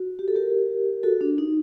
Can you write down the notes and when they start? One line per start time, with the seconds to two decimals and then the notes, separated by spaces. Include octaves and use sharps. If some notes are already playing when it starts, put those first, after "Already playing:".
Already playing: F#4
0.19 G4
0.28 A4
0.36 G4 A#4
1.03 F#4 A4
1.21 D4
1.38 D#4